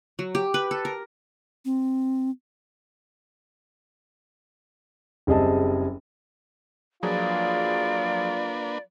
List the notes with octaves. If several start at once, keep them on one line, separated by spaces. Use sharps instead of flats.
F#3
G4
B4
A4
A#4
C4
F#1 G3 C4 G#4 D#5 A5
F3 F#3 A#3 D4 F4 G#4 B4 D5